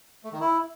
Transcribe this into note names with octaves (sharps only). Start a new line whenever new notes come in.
A3
D#3
E4